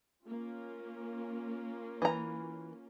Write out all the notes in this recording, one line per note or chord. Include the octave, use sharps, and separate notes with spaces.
A#3 C#4 F4
E3 A#5